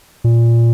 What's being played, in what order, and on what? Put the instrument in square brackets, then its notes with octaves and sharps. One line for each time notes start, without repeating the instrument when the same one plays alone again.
[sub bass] A#2